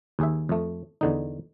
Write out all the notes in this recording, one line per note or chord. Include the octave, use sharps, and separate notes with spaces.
D#2 G#4 E5
F2 A3
E2 D3 D#4